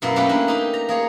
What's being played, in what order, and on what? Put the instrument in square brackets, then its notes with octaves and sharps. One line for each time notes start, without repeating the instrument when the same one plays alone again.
[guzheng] F#2 B2 A#3 E4
A3 A#3 C#4 G4 B4 G5
D4 E4
D#4 G4
A#5
A#3 G#4 C#5